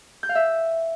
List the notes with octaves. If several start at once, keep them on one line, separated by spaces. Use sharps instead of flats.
G6
F5
E5